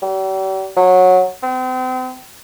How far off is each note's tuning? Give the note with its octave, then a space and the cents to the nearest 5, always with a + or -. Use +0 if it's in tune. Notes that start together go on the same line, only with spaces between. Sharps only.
G3 -45
F#3 -15
C4 -35